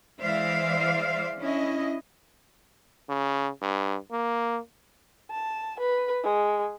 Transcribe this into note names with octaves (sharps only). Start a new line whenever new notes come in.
E3 G#3 C5 D5 E5 F5
C#4 D4 E4 D#5
C#3
G2
A#3
A5
B4
G#3